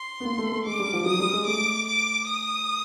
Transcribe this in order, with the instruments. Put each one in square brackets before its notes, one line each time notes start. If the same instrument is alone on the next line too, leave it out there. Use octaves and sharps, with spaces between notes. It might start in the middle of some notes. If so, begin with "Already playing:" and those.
Already playing: [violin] C6
[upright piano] B3
A#3
A3
A3
[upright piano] G#3 [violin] D6
[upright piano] G3
F3
[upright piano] F#3 [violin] D#6
[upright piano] G3
G#3
[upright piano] A3 [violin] D6
[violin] D6
D#6